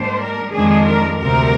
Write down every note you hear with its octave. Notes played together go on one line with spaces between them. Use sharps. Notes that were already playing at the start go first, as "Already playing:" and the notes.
Already playing: G#2 G3 A#3 D4 C5
A#4
F2 D#3 G#3 D4 G#4
A#4
D2 C3 G3 A#4